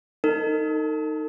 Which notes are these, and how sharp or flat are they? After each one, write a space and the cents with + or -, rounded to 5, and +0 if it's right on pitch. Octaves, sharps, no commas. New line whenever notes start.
D#4 +0 A4 +45